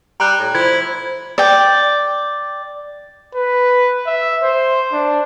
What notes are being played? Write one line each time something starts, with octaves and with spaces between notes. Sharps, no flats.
G3 A#5 F#6
A2
F3 E4 G#6
D5 G5
B4
E5
C5
D4